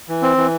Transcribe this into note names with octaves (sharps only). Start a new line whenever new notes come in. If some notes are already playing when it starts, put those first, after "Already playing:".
E3
C4
E3